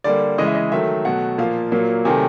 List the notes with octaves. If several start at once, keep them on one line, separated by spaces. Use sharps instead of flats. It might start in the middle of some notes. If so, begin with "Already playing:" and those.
D3 G3 A#3 D5
C#3 E3 G#3 D#5
E5
D#5
D#3 F#3 A3 E5
B2 F#3 A3 F#5
A#2 F3 A#3 F5
A#2 F#3 A#3
C3 D#3 F#3 A3 G#5